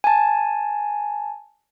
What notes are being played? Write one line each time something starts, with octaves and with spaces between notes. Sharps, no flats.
G#5 A5